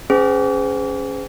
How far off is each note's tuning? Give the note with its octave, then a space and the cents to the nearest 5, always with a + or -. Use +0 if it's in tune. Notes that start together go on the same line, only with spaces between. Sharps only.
C#4 +0 G#4 +0 C5 -45